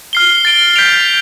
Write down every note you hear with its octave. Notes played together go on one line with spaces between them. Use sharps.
F6 C7 G7
A6 D7 G7
G6 B6 D7 F7